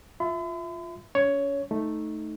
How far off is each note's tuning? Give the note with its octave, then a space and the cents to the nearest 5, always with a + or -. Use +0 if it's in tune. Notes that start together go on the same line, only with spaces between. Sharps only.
F4 +0 E5 +0 B5 +45
C#4 +35 C#5 +10
A3 +0 D#4 +0